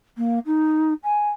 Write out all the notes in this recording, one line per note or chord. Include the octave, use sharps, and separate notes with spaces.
A#3
D#4
G#5